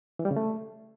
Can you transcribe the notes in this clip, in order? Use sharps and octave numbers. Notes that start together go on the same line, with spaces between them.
E3
G3
C#3
A3